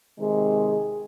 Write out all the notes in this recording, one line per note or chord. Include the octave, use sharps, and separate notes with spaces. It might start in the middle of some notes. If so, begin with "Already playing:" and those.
C3 D#3 G#3
G#4